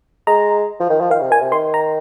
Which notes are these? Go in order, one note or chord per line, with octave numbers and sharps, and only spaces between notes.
G#3 A#5
F3
D#3
F3
D#3 F5
C3
A#2 G#5
C3
D#3 C6
A#5